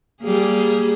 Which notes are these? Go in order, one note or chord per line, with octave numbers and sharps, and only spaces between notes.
G3 A#3 G#4